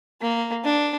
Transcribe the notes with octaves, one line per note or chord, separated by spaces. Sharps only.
A#3
D4